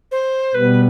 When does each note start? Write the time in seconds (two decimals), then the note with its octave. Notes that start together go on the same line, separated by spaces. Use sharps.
0.11 C5
0.54 B2 G3 B3 B4